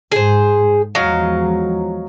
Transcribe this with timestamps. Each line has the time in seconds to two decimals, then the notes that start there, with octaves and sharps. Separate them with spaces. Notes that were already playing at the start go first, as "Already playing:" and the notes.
0.12 G#2 G#4 C5
0.95 E2 F3 F#3 G#3 D#5 F5